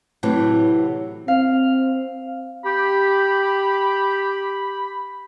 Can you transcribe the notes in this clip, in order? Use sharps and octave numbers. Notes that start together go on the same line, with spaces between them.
A2 C3 E3 F#3
C4 F5
G4 B5